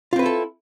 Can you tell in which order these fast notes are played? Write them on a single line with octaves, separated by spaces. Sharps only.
F4 C4 B4 E4 A4